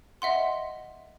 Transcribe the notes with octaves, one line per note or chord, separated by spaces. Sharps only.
D#5 E5 F#5 C6